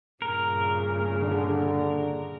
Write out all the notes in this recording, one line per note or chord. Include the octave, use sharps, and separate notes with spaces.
G2 A#2 C#3 A#4
D3